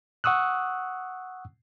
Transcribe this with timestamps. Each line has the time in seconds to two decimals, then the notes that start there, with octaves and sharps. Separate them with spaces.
0.24 F#5 C#6 D#6 E6 F#6